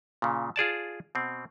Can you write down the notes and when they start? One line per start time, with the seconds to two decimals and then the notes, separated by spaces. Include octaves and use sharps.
0.22 A#2 C#3
0.56 F4 G#4 D5 A5
1.15 B2 C4